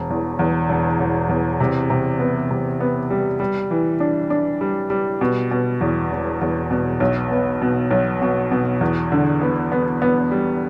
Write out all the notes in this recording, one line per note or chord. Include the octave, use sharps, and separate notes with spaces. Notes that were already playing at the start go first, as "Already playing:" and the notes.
Already playing: E1
E2
E2
E1
E1
E2
C3
C3
B3
C3
B3
G3
G3
E3
D4
D4
G3
G3
B2
B2
E2
E1
E2
B2
B1
B3
B2
B1
B2
B2
E2
D3
B3
B3
B3
G3